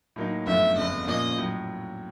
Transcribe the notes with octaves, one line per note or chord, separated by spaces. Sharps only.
A2 F#3 A#3 D#4
G1 F#2 D3 F3 A3 E5
G1 F2 C#3 D#5
A#2 F3 A#3 C#4 F4 D#5
A2 F#3